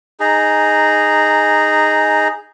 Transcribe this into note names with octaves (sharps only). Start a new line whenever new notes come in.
D#4 G#4 A#5